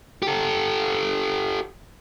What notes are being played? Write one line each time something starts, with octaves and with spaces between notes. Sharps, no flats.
G4 A4